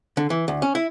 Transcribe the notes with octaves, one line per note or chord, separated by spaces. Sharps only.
D3
E3
D2
C#4
E4